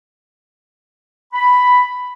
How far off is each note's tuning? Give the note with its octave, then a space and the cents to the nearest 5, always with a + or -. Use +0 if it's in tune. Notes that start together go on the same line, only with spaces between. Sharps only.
B5 +5